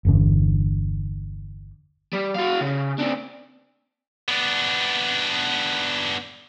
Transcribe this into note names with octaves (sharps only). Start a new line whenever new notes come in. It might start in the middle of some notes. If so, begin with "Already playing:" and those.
G1 E2 D3
G3
F#4 F5
C#3
C4 D4
B3 D4